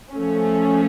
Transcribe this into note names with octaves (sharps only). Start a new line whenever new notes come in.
F3 A3 C#4